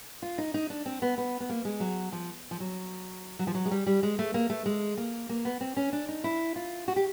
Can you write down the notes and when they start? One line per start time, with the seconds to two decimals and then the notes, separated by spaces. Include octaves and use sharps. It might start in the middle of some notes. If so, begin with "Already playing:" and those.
0.22 F4
0.38 D#4
0.54 D#4
0.70 D4
0.86 C4
1.02 B3
1.18 B3
1.40 B3
1.49 A#3
1.65 G#3
1.80 F#3
2.12 F3
2.51 F3
2.60 F#3
3.39 F#3
3.47 F3
3.55 F#3
3.65 G#3
3.71 G3
3.87 G3
4.03 G#3
4.19 A3
4.34 A#3
4.50 A3
4.66 G#3
4.97 A#3
5.29 A#3
5.45 B3
5.61 C4
5.77 C#4
5.93 D4
6.09 D#4
6.24 E4
6.56 F4
6.88 F#4
6.96 G4